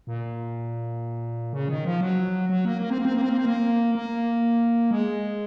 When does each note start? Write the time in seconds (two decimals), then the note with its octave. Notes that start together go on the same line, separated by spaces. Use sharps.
0.07 A#2
1.53 C#3
1.69 D#3
1.85 F3
2.01 F#3
2.49 F#3
2.65 A#3
2.82 A#3
2.90 C4
2.98 A#3
3.05 C4
3.14 A#3
3.21 C4
3.29 A#3
3.38 C4
3.45 A#3
3.95 A#3
4.91 G#3